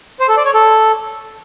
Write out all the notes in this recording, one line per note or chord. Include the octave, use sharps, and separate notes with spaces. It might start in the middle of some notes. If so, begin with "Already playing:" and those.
C5
A4
D5
C#5
A4